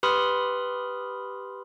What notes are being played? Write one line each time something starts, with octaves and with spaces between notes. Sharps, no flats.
G4 B4 B5 C6 D#6 F6